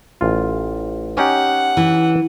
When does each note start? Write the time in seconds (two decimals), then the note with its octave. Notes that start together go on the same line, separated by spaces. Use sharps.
0.21 A1 F4
1.17 C#4 D#4 G4 F#5
1.77 E3